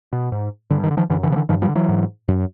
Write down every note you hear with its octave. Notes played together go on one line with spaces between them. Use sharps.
B2
G#2
G2 D3
D#3
D3
D#3 F3
F#2 D3 E3
D3 E3
C#3 F3
D3 E3
G2 D#3 F3
F3 G3
D3
E3 F#3
G#2
F#2